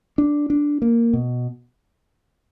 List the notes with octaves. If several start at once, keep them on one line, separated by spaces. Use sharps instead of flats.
D4
D4
A#3
B2